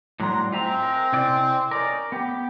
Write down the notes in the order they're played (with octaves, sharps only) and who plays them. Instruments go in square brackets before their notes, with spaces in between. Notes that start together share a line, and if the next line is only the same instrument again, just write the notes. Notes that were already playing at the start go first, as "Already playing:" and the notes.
[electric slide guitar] A2 F#3 G3 [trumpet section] D4 A#5 C6
[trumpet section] G#3 C4 [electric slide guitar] F4 E5 A#5
[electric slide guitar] A#4
C3 E4 D5
[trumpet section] C#4 D#4 D5 [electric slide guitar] A#4
[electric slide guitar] B3 [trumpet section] G4